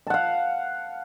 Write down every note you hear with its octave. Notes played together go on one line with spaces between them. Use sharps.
F5 F#5 A5